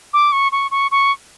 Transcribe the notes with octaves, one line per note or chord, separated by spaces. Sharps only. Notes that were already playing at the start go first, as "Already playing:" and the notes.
D6
C#6
C#6
C#6
C#6